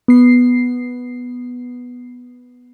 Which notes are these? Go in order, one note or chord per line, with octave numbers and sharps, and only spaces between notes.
B3 C7